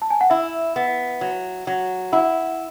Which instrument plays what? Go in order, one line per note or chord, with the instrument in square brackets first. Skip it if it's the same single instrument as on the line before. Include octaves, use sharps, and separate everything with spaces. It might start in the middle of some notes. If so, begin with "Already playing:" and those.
[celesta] A5
G#5
F#5
[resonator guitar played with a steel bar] E4 [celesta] E5
[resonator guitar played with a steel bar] B3
F#3
F#3
[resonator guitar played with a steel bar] E4 [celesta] F#5